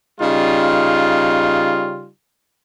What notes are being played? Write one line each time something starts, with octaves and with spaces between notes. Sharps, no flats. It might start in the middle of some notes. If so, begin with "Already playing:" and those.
C#3 G3 D#4 F4